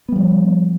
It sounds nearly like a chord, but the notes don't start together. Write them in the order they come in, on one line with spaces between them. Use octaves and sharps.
B3 G3 F3